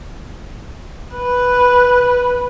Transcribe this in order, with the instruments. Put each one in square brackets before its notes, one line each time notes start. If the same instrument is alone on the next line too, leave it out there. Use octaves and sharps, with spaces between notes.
[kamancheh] B4